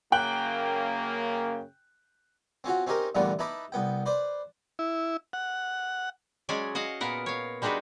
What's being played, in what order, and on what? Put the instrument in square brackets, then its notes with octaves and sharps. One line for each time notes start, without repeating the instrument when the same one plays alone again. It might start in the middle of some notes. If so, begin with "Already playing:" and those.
[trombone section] F#2 C#3 A#3 [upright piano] G5 F#6 F#7
[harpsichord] C4 C#4 F4 F#4
C4 C#4 D#4 G4 A#4
A#2 D3 E3 G3 A3 B3
D#4 E4 B4 A5 B5 D6
C2 B3 G5
B4 C5 D5
[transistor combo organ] E4
F#5
[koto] F#3 G#3 C#4 G#4 D5 G#5
F#4 D#5 F5 F#5
A#2 B3 A#4 F#5
C#5 F5
G3 G#3 D4 D#4 F#4 B4